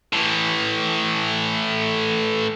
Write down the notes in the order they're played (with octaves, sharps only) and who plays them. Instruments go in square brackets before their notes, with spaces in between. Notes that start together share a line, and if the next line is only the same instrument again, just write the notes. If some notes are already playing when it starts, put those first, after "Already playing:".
[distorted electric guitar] A2 E3